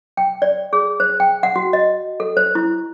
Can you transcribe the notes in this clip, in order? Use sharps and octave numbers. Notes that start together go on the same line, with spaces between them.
G5
D5
G#4
C5
G5
F#5
F#4
D#5
A4
C5
E4